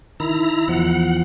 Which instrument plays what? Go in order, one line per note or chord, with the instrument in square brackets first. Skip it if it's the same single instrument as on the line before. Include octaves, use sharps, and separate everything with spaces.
[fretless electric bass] D#3 [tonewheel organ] E4 A#5
[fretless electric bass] E2 F3 [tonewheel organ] F#5